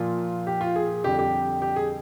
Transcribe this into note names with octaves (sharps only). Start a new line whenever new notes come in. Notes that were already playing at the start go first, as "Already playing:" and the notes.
Already playing: A#2 F3 F4
G4
F4
G#4
F2 D3 G3 G4
G4
G4
G#4